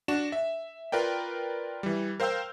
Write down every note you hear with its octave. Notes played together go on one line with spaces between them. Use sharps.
D4 F#4 E7
E5
F4 A#4 B4 D5 G5
E3 G3
A#4 C5 F5 G5 E6 G6